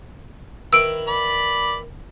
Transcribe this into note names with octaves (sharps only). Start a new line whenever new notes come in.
D#3 E4 B4 E6 D7
D5 B5